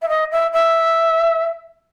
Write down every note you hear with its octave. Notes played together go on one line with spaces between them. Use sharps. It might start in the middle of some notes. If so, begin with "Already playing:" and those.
E5
D#5
E5
E5